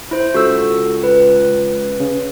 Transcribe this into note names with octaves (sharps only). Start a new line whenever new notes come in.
E4 C5
C#2 F#4 A4 E6
B4
C#3